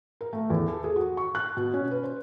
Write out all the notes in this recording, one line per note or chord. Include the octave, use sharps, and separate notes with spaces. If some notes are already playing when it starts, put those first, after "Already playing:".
A#4
A3
E2
A4
G#4
F#4
C#6
F#6
B2
C#4
B4
C5